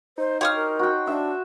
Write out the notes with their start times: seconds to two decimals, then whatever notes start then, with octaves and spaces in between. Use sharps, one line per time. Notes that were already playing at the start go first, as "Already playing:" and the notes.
0.18 D#4 C5
0.41 G4 C5 C#5 F5 D#6 F6
0.55 A#4
0.79 F#4 G5
1.07 D4 E5